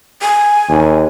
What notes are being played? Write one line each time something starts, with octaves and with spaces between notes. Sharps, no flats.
G#5
D#2